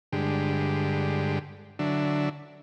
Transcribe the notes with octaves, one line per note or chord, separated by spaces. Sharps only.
G2 D3 G#3 G4
D3 F#3 D4 E5